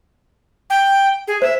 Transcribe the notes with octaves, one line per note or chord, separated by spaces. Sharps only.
G5
G#4
C5 E5